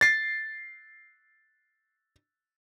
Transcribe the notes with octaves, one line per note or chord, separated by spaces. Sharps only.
A6 C7